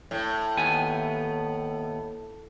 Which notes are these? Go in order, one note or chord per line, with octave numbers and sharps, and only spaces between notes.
A2
D#2 B3 G#5